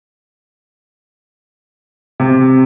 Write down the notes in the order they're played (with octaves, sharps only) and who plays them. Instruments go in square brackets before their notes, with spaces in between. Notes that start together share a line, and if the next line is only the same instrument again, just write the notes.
[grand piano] C3